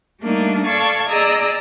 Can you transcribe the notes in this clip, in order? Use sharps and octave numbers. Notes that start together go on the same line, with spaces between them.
G3 A3 A#3 D4 D#4
A4 D5 F5 A5 C#6 G#6
G#4 D5 D#5 A#5 E6